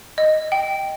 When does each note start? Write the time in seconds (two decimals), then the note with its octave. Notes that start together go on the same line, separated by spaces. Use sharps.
0.18 D#5
0.52 G5